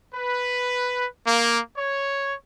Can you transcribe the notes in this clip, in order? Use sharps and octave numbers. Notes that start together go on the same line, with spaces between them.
B4
A#3
C#5